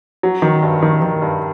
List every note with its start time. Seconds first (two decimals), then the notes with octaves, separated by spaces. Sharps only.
0.23 F#3
0.42 D#3
0.63 G2
0.82 D#3
1.02 D#3
1.22 G2